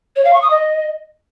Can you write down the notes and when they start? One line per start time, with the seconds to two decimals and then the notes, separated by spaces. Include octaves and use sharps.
0.16 C#5
0.25 F5
0.33 C#6
0.42 D#6
0.50 D#5